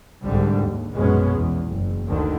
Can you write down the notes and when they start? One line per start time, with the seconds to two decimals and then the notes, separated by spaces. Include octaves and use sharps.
0.24 C2 G#2 D3 G3
0.65 D#2
0.94 A#1 F#2 B2 G#3 B3 C#4
1.36 E2
1.68 F#1
2.08 D2 D3 D#3